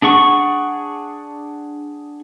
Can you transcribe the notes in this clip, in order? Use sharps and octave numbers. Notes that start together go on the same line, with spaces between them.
D4 G#4 F#5 C#6